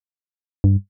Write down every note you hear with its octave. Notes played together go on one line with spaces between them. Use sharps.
G2